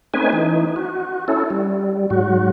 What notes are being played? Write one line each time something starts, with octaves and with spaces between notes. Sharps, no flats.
A3 C4 C#4 D#4 B4 G#5
E3 D#4
F#4
C#4 E4 A4
G3
G#2 F#3 F#4